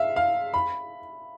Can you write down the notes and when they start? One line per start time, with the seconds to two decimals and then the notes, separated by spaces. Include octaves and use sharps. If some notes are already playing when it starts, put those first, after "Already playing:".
Already playing: E5 F5
0.16 F5
0.54 B5